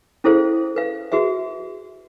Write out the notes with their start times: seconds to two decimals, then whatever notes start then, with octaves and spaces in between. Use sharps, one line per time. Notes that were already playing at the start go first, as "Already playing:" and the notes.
0.24 C#4 E4 G#4 A4 C5 F5
0.76 B4 F5
1.12 F#4 G#4 B4 E5